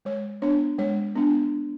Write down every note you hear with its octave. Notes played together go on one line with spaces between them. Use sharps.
G#3 C#5
B3 D4 C#5
G#3 C#5
B3 D4